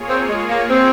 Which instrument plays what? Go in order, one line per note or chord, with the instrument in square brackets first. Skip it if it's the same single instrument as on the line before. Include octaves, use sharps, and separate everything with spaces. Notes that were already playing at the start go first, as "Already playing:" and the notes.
Already playing: [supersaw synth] A#3 F4 G#4 C#5
[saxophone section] C4
G#3
A#3
C4